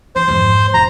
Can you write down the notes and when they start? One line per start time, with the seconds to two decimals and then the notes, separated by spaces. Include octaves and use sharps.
0.16 E3 C5
0.28 F2 G#2
0.74 E1 A#5